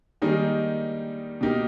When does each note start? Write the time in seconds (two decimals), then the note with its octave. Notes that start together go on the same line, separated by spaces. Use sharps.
0.22 D#3 G3 A#3 D#4 G#4
1.41 B2 A#3 D#4 G4